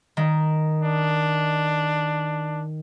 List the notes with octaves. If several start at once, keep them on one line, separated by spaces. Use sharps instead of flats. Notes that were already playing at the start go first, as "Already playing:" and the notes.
D#3
D4